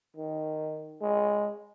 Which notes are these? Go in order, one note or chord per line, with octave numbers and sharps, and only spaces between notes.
D#3
G#3